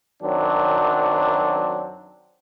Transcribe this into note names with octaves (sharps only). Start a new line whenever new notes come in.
F#2 D#3 F#3 C4 D4